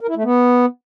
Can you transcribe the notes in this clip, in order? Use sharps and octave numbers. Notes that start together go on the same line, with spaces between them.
A#4
E4
A3
B3